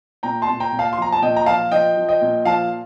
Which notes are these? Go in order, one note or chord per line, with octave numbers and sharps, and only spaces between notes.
A#2 G5 A#5
A5 C6
A#2
G5 A#5
A#2
F5 A5
C6
F3 A#5
A5
A#2 D#5 G5
A#5
F3 F5 A5
F3 D#5 G5
F3
D#5 G5
A#2
F3 F5 A5